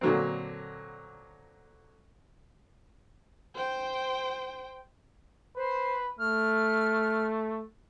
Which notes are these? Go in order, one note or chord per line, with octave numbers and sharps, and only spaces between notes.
A#2 D3 F#3 A#3 C4
C5 G5
B4 C5
A3 F6